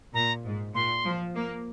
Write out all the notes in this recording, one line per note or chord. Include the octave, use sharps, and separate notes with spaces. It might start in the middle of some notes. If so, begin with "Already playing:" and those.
A#2 A#5
G#2
A#2 C6
F3
A#3